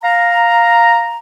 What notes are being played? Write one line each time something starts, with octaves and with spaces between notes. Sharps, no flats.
F5 A#5